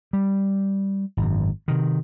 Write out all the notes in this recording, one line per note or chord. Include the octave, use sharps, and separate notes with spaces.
G3
G#1 F#2
C3 D#3